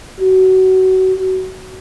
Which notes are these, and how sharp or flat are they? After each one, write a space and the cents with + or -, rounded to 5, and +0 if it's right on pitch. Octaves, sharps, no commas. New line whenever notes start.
F#4 +25